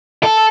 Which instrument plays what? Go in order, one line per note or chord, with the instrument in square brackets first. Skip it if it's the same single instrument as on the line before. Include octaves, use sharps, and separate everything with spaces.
[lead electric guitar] A4